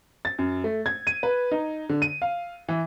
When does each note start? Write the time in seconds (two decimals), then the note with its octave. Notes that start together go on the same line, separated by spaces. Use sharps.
0.25 A6
0.39 F#2
0.64 A3
0.86 G#6
1.07 D#7
1.23 B4
1.51 D#4
1.89 D3
2.02 D#7
2.22 F5
2.69 E3